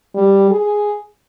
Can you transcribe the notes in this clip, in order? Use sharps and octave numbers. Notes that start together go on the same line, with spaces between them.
G3
G#4